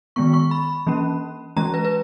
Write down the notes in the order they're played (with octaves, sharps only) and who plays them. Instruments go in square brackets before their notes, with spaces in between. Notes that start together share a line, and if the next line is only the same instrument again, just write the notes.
[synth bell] D#3 G#3 B3 C#6
C#6
B5
E3 A#3 C#4
E3 G#3 C#4 A#5
B4
B4